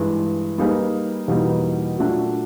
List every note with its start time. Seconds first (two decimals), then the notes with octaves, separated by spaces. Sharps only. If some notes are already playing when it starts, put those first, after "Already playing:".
Already playing: G2 E3 G#3
0.58 G3 A#3 D#4 G#4 B4
1.28 E2 B2 G3 A#3 D#4
1.98 A#2 F#3 A3 D4